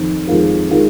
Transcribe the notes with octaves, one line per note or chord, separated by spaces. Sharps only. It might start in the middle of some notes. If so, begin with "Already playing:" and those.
Already playing: F2 D#3
F2 D#3 G#3 F4 A#4
D#3 G#3 F4 A#4